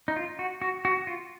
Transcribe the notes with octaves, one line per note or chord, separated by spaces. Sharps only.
D#4
F4
F#4
F#4
F#4
F4